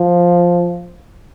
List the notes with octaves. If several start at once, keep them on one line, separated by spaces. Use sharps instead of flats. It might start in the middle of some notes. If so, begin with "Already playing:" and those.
Already playing: F3